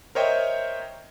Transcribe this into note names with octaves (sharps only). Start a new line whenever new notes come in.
A#4 C5 C#5 D#5 E5 G5